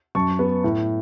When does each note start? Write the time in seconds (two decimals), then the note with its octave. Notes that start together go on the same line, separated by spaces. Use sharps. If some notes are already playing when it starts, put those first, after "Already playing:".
0.15 F#2 A5 C#6
0.39 B3
0.64 A2